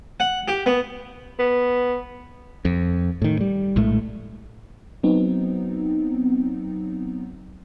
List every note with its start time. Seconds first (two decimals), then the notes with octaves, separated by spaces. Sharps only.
0.20 F#5
0.48 G4
0.66 B3
1.39 B3
2.65 F2
3.22 A2 D#3
3.40 G3
3.76 A#1 A2 G#3 A3
5.03 F#3 B3 C4 D#4